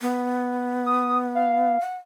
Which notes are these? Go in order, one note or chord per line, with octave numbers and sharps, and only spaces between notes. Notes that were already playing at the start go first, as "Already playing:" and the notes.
B3
D#6
F5
F#5